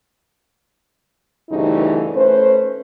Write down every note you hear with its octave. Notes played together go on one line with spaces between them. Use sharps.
D2 G2 C#3 E3 D#4
A3 C#4 B4 C5